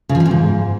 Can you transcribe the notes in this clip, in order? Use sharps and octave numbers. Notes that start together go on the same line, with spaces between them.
C#3
F3
E3
A#2
G#2